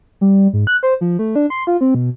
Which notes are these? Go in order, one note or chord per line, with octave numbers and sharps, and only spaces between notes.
G3
G#2
F#6
C5
F3
A3
D4
C6
F4
C4
B2